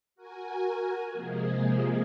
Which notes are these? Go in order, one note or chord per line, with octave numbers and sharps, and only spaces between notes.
F#4 A#4 G#5
C3 F3 G#3 A#3 G#4